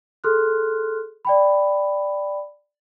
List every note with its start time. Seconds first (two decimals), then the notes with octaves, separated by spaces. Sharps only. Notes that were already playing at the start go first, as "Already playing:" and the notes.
0.24 G#4 A4 C6 F6 F#6
1.25 D5 G5 B5